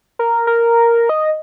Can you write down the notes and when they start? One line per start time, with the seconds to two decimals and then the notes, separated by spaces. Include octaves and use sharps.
0.19 A#4
0.47 A#4
1.09 D#5